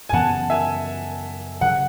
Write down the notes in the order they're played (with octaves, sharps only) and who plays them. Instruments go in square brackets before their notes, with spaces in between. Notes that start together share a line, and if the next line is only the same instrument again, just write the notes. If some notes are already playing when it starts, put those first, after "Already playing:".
[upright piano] G#5
[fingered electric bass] F#2 C#3 E3 B3 [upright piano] F#5 A5
[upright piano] E5 G#5
[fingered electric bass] C#3 F#3 [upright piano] F#5